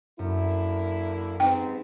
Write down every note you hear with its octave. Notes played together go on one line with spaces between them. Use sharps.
F#2 D3 A#3 E4
G#2 B3 C4 D#4 G4 G5